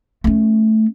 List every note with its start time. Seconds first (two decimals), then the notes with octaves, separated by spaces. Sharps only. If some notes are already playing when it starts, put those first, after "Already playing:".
0.24 A3 C#4